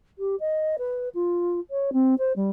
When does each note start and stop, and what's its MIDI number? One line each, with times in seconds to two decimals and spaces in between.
0.18 0.35 67
0.40 0.76 75
0.78 1.09 71
1.14 1.60 65
1.70 1.90 73
1.93 2.14 60
2.18 2.32 72
2.36 2.50 55